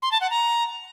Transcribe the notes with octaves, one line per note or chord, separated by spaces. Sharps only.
C6
A5
F#5
A#5